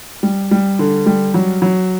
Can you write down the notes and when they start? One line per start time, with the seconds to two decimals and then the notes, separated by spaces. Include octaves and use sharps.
0.23 G3
0.51 G3
0.79 D3
1.06 G3
1.34 F#3
1.62 F#3